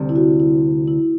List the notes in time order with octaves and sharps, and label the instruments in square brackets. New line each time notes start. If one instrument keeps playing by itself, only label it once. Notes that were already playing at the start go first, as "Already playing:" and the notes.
Already playing: [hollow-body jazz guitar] D2 C3 G3
[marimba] E4
F#4
E4
E4